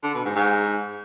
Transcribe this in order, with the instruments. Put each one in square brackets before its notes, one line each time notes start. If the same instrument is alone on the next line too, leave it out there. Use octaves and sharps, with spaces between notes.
[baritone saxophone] D3
B2
G#2
G#2